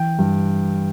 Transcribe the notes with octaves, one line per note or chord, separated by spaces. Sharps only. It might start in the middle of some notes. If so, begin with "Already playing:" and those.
Already playing: E3 G5
G2